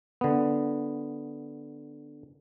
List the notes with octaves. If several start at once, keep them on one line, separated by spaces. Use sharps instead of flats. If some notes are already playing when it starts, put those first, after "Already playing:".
D3 B3